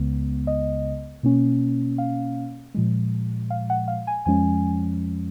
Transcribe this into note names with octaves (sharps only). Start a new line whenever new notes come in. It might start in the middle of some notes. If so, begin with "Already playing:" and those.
Already playing: C#2 C#3 G#3 B3
D#5
B2 A#3 C#4
F5
A#2 F3 G#3
F5
F#5
F5
G#5
F2 F3 G#3 C#4 G#5